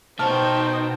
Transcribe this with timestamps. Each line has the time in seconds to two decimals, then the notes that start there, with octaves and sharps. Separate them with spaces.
0.19 B2 D#4 F#4 C5 G5 A5 F6